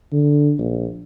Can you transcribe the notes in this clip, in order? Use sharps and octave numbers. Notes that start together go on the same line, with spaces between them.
D3
A#1